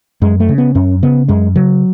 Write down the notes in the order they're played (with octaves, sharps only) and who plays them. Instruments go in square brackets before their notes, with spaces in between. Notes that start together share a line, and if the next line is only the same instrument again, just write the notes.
[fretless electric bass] F#2 G#3
A3
C#3
B3
F#2 C#4
C#3 B3
F#2 G#3
C#3 F#3